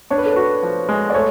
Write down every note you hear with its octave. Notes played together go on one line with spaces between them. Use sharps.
D4 C#5
B4
A4
F#4 B4
F3
G#3
D5
A3 C#5